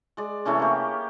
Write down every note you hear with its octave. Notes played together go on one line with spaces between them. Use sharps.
G#3 D5
C3 E3 A3 C#4
A#3 G4